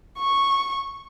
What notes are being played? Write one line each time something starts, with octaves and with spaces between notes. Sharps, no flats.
C#6